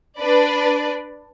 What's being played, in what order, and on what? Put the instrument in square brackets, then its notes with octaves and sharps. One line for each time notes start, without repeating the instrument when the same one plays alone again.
[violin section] D4 B4 D5